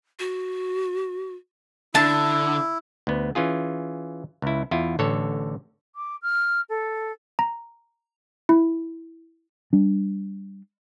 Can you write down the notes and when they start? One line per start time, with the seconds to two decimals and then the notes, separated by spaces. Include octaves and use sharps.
0.19 F#4
1.95 D3 D4 E4 A5
3.07 D2 B3
3.35 E3 C#4 F4 G#4
4.42 C#2 E4
4.71 E2 E4 F4
4.99 A1 D3 A4 C#5
5.95 D6
6.22 F6
6.69 A4
7.39 A#5
8.49 E4
9.73 G3 D4